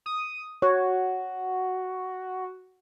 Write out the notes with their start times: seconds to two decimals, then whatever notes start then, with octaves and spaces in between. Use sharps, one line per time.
0.06 D#6
0.62 F#4 C#5